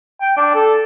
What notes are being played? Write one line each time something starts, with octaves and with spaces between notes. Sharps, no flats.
G5
D4
A4